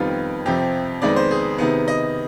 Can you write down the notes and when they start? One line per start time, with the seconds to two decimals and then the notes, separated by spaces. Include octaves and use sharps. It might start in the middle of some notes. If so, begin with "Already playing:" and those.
Already playing: F2 D#3 G3 B3 F4
0.46 F2 C3 F3 G4
1.02 F2 D#3 G#3 B3 D5
1.16 C5
1.31 G#4
1.58 C3 D#3 B3
1.88 D#5